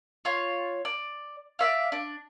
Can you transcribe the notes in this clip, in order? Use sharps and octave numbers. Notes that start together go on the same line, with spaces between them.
F4 C#5
D5
D5 E5 F5
D4